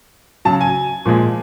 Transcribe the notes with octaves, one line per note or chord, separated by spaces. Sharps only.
C#3 F#3 A5
G#5
A#2 F3 G#3